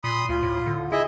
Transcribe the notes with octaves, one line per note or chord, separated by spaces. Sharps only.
A#2 B5 C6 D#6
D2 F4
A2
D3
E4 G#4 D#5 E5